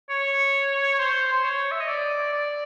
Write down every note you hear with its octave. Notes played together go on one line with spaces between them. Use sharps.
C#5
C5
C5
C#5
E5
D#5
D5
D5